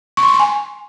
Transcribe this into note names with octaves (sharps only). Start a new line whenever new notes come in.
C#6
C6
C#6
C6
G#5